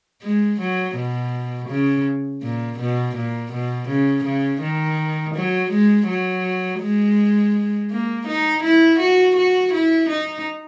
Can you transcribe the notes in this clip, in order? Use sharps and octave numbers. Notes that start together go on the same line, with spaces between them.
G#3
F#3
B2
C#3
A#2
B2
A#2
B2
C#3
C#3
D#3
F#3
G#3
F#3
G#3
A#3
D#4
E4
F#4
F#4
E4
D#4